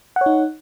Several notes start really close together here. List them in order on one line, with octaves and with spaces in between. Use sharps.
F#5 C#5 D#4